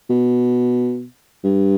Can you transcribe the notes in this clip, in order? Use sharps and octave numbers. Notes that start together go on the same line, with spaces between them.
B2
G2